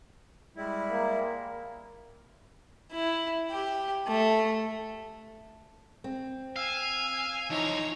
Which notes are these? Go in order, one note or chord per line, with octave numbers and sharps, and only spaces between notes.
G3 G#3 E4
A#3
E4
G4
A3
C4
F5 G#5 E6
E3 F3 D#4 C#5 A#5